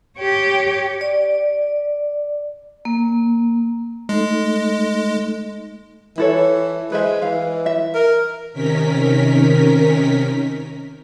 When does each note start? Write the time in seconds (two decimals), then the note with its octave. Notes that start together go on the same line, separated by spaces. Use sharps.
0.19 G4 C#5
1.01 D5
2.85 A#3
4.09 G#3 A3 D#4 A4
6.18 E3 E4 A4 C#5
6.92 G#3 B4 C5 E5
7.22 E3 F5
7.66 E5
7.95 A#4
8.53 C3 D#3 C#4 A#4 B6